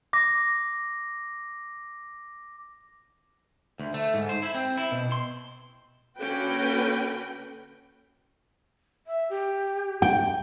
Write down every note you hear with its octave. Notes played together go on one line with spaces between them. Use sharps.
D6 A#6
D2
A3
G#2
C5
E4
C4
E4
B2
C6
D3 A#3 C#4 F#4 B4 G5
E5
G4
G5